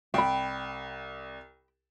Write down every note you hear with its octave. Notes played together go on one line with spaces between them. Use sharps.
C2 G5 B5